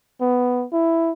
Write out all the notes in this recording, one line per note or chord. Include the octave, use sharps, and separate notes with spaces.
B3
E4